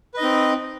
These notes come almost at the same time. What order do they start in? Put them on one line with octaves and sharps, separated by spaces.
B4 D#5 D#4 C4